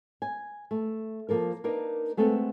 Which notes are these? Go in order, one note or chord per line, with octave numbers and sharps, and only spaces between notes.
G#5
A3
F3 A#3 A4 A#4
A#3 D4 D#4 A#4 B4
G#3 A3 B3 C4 A4